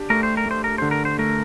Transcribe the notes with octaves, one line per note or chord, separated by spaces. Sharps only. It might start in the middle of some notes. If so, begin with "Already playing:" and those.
Already playing: D4 G4
A3 A#4
C5
A#4
A3 C5
A#4
D3 C5
A#4
C5
A3 A#4